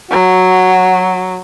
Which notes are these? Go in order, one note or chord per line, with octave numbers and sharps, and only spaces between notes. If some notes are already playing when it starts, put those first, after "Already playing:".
F#3 F#4